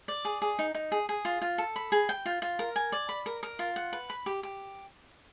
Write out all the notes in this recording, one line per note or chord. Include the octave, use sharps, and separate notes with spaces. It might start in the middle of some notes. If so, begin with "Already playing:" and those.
D5
G#4
G#4
D#4
D#4
G#4
G#4
F4
F4
A4
B5
G#4
G5
F4
F4
A#4
G#5
D5
B5
A#4
A#4
F4
F#5
B4
B5
G4
G4